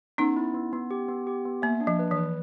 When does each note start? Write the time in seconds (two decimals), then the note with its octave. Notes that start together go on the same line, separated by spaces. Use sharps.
0.18 B3 C#4 D#4
0.37 E4
0.54 B3
0.73 B3
0.91 G4
1.08 B3
1.27 G4
1.45 B3
1.62 A#3 E5
1.81 D4
1.87 F3
1.99 B4
2.11 E3 B4